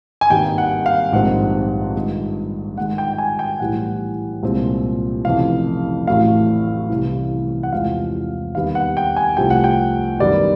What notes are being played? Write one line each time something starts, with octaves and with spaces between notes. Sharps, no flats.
G#5
G#1 G2 D#3 G3 A#3 G5
F#5
F5
A#1 G#2 D#3 G3 C4 F#5
G2 D#3 G#3
G2 D#3 G#3 F#5
G5
G5
G#5
G5
B1 A2 E3 G3 F#5
C2 A#2 F3 G#3 C4
F1 F2 C#3 E3 F5
A1 A2 F#3 A3 F5
C2 C3 E3
F#5
E2 C3 F3 G#3 C4 F5
D#2 D#3 G3 B3 F5
F#5
G5
G#5
C2 C3 F3 A3 C4 G5
F#5
G5
F#2 D#3 G3 B3 D5